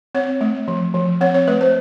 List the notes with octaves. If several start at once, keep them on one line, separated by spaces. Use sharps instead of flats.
C4 C#5
A3
F3
F3
C4 C#5
C#5
A3 B4
C5